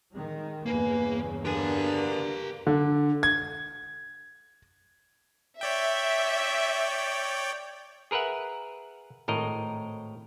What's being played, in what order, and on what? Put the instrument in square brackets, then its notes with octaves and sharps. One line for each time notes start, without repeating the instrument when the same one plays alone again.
[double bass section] D#3 G#3
[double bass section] E2 G2 C#3 [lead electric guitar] A#3 [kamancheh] B4 G#5
[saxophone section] D3 B3 D4 [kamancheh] A#3 [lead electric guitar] G4 G#5
[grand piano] D3
G#6
[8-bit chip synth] C#5 D5 G5 [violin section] E5
[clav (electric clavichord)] G#4 A#4 B4 E5 F#5
G#1 A2 A#4 D#5